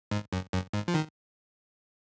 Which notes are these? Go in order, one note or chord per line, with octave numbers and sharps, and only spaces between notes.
G#2
F#2
F#2
G#2
F3
D#3